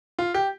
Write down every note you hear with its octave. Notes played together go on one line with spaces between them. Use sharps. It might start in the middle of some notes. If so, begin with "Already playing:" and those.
F4
G4